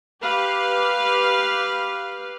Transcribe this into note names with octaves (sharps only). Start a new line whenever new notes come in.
G4 B4 F5